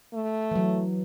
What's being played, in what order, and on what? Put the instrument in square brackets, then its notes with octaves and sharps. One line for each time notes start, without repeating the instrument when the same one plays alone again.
[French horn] A3
[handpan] E3 F#3